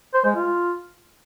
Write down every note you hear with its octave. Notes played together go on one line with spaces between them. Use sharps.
C5
G#3
F4